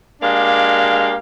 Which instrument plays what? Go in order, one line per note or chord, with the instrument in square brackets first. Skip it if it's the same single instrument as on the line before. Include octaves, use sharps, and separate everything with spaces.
[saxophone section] G#3 A#3 D4 G4 F5